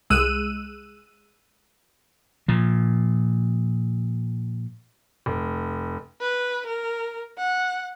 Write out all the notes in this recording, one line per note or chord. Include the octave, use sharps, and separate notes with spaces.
C2 G#3 E6 F#6 D#7
A#2 F3
F1
B4
A#4
F#5